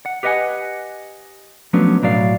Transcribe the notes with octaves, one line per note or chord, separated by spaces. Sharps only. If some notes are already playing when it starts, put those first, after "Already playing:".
F#5
G4 B4 D#5 E5 F#5 G#5
F3 F#3 A3 B3 C#4 D4
B1 A2 F#3 D5 F5